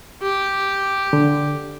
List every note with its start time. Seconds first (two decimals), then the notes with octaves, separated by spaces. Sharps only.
0.22 G4
1.13 D3